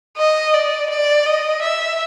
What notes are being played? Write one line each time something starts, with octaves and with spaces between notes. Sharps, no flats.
D#5
D5
D5
D#5
E5